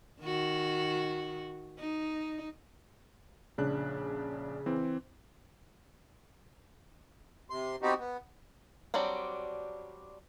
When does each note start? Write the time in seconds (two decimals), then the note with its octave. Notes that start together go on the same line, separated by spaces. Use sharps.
0.22 D#3 F#4
1.79 D#4
3.58 A#1 C#3 D4 F#6
4.66 E3 C4
7.50 C3 C6
7.82 B3 C4 D#4 F#4 G4
7.99 B3
8.94 F#3 G3 C4 D4